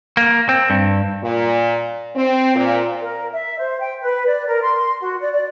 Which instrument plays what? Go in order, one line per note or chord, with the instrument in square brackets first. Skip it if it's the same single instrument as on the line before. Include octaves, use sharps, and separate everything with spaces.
[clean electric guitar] A#3
C4
G2
[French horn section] A#2
C4
A#2
[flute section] A#4
E5
C5
G5
B4
D5
A#4
C6
F#4
D5
D5